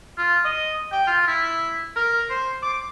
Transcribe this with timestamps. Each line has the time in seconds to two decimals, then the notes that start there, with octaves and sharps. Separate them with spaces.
0.18 F4
0.45 D#5
0.92 G5
1.07 F4
1.27 E4
1.96 A#4
2.30 C5
2.62 D6